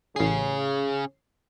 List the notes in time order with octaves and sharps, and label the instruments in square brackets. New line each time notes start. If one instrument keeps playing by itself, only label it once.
[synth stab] A1 C7 [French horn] C#3 [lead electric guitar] C#4 G#4